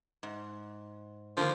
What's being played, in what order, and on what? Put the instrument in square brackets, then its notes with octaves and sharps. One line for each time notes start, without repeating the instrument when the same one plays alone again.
[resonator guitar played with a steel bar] G#2
[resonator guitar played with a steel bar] D3 D#3 A#3 [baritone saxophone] F3